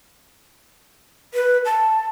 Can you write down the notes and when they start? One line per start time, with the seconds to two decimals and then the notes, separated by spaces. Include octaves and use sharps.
1.34 B4
1.65 A5